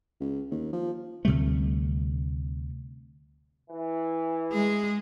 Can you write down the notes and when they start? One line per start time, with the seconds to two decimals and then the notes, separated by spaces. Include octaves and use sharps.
0.20 C#2
0.51 D#2
0.73 F3
1.25 D2 C3 G3 A3
3.70 E3
4.53 G#3 G#4